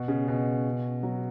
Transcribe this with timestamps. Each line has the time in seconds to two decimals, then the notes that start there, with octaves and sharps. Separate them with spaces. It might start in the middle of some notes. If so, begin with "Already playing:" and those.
Already playing: B2
0.08 C#3
0.28 B2
1.03 F#3